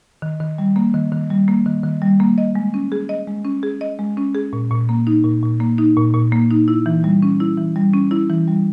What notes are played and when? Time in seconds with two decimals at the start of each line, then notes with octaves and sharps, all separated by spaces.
0.22 D#3
0.40 D#3
0.58 G3
0.76 A#3
0.94 D#3
1.12 D#3
1.30 G3
1.48 A#3
1.66 D#3
1.83 D#3
2.02 G3
2.20 A#3
2.38 D#5
2.55 G#3
2.74 C#4
2.92 G#4
3.09 D#5
3.27 G#3
3.45 C#4
3.63 G#4
3.81 D#5
3.99 G#3
4.17 C#4
4.35 G#4
4.53 A#2
4.70 A#2
4.89 A#3
5.07 D#4
5.24 A#2
5.43 A#2
5.60 A#3
5.78 D#4
5.96 A#2
6.14 A#2
6.32 A#3
6.51 D#4
6.68 E4
6.86 E3
7.04 G3
7.23 C#4
7.40 E4
7.57 E3
7.76 G3
7.93 C#4
8.11 E4
8.30 E3
8.48 G3